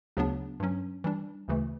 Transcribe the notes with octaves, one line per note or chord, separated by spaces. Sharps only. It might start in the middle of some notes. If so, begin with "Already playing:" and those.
D2 C#3 F#3 B3 D4
G2 F#3 C#4
E3 G3 D4
D2 C#3 E3 A3